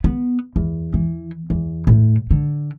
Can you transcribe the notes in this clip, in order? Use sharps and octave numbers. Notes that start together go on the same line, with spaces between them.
B3
E2
E3
E2
A2
D3